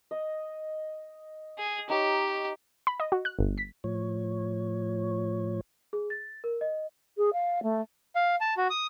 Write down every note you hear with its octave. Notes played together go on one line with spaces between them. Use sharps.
D#5
G#4
D#4 G4 C#5
B5
D#5
F#4
F#6
G1
B6
A2 F3 C#5
G#4
A6
A#4
D#5
G#4
F5
A3
F5
A5
F#4
D#6